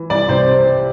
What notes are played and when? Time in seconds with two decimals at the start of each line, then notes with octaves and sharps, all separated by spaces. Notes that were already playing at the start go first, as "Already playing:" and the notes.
Already playing: E3
0.10 C2 D5
0.29 C3 C5